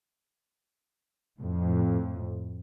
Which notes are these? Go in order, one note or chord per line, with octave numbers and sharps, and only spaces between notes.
F2 A2